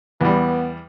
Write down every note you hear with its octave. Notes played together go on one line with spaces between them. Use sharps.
E2 G3 B3